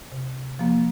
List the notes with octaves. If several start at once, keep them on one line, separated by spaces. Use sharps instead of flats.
C3
F3 A#3